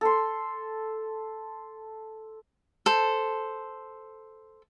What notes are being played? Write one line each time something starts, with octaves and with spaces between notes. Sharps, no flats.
A4 C6
A4 C5